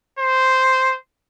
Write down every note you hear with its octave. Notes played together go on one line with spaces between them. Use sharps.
C5